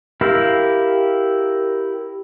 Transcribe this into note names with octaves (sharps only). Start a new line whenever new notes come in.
E4 G4 A#4 F5